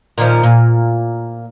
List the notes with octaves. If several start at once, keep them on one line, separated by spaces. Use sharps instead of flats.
A#2 D#3 F3
A#2